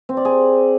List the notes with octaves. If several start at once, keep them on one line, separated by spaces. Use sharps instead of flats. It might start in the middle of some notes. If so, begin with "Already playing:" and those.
C4
D5
G#4